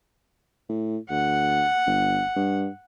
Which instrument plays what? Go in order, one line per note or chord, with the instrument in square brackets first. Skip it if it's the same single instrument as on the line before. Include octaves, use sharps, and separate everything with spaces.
[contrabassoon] A2
[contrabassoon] D2 [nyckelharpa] F#5
[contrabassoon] G1
G2